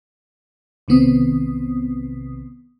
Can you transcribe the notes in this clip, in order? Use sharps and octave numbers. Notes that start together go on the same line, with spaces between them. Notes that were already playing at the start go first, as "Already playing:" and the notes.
B1 C3 D#3 B3 C4 D#6